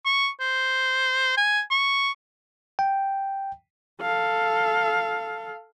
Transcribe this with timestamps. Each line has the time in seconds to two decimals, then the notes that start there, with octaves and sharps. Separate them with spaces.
0.05 C#6
0.40 C5
1.37 G#5
1.71 C#6
2.79 G5
4.01 A4 F5